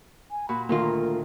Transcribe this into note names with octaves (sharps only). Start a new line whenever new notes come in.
G#5
A#2 F#4 B5
D2 A#2 D#3 F4 A#4